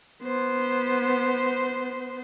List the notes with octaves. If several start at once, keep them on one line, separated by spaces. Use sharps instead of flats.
B3 C5